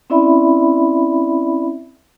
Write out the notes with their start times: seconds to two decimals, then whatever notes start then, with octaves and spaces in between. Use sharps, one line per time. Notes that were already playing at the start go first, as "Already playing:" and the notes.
0.10 C4 C#4 E4 D5 E5 B5